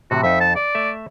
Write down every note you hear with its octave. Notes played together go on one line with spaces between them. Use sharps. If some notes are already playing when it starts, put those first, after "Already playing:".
A2 C3 E3 F#4
F2 D#4 E5
A5
D5
A3 E5